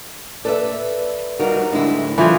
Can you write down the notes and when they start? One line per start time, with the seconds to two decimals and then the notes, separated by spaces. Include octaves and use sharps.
0.45 A4 B4 D5 E5
1.39 G3 D#4 F4 F#4 A#4
1.72 A2 D3 G#3 D4 E4
2.18 E3 F3 C4 F4 A4